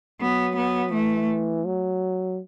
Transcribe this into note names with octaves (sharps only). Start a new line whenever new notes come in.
F#3 B3
B3
E3 A3
F#3